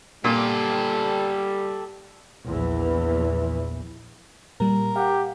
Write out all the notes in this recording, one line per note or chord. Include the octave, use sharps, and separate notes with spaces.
A#2 G3 G4 A4
A#1 E2 E3
A#2 G3 A#4
G4 F5 F#5